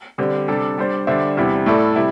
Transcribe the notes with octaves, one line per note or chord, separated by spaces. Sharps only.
D3 G3 C4 G4
C3 G3 D4 A4
G3 D4 C5
D3 G3 D4 C5 E5
E2 C3 G3 E4
A2 A3 E4 A4 D5
C3 G3 E4